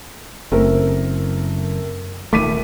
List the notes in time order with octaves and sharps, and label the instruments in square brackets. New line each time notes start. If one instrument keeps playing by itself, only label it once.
[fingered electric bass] F#1 [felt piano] A3 C4 A#4
[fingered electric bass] D#1 D#3 A3 [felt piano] D6 B6 D#7